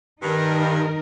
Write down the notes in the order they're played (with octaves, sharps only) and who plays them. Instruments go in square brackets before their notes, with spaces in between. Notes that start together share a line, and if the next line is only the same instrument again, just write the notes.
[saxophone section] G2 [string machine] D#3 [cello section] D#4 A#4